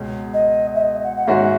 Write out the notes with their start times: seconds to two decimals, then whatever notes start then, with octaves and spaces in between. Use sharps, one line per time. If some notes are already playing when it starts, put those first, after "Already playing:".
Already playing: C#2 B2 G#3 C#4
0.34 D#5
0.75 E5
0.81 D#5
1.04 F#5
1.17 F#5
1.27 G#2 D#3 G#3 C#4 F#4 E5